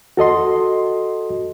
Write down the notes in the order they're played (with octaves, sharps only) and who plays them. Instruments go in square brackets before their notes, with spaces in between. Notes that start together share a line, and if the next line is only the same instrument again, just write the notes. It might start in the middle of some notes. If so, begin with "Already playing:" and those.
[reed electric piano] F#4 A4 D#5 C6